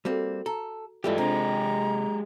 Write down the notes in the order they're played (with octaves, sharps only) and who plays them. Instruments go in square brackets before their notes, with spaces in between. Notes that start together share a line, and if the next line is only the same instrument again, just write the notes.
[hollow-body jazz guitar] G3 A#3 C4 [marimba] F#4 A4
[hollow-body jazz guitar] A4 [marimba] A#5
[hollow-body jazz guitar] G2 E3 G3 [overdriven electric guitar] G#3 G4 [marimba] F4 A4
[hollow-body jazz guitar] C3 [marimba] D4 C5 [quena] A#5